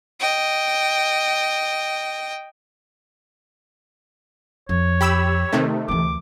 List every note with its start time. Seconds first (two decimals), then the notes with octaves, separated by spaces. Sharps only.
0.20 D#5 G5
4.69 F2 C#5
5.01 G4 B5 E6
5.53 C3 D#3 A3
5.88 D2 E3 D6